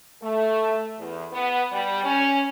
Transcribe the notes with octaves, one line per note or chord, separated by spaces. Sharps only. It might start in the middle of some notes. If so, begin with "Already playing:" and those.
A3
E2
B3
G3
C#4